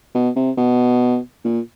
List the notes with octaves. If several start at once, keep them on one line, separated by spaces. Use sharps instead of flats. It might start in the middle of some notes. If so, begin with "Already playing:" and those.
B2
C3
B2
A#2